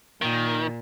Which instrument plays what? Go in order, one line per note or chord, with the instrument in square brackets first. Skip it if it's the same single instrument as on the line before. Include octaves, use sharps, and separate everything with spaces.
[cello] A#2 [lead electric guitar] D#3